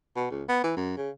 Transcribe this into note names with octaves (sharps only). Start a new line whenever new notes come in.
B2
C#2
B3
E3
F#2
C#3